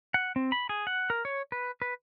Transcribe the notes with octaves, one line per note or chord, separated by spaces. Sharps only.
F#5
C4
B5
G#4
F#5
A#4
C#5
B4
B4